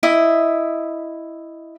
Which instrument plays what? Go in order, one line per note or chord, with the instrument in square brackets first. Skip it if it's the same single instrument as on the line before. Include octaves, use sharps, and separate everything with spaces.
[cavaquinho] E4 D#5 E5